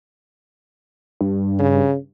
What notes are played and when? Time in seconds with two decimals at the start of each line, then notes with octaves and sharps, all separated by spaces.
1.21 G2
1.59 C#3